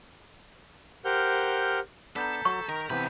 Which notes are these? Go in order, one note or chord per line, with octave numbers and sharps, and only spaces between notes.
G4 A#4 C5 F#5 F6 G6
B3 D4 A4 A#5 G6 B6
F#3 C#6
D#3 A#4
C3 E3 B3 C4 B5 G6